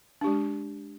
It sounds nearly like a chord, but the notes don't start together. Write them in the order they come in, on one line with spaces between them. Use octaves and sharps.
D4 G4 G#3